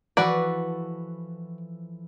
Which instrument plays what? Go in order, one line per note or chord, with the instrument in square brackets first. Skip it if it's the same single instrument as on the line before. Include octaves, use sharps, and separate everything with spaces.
[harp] E3 F3 A4 [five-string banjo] F#4 B4 D5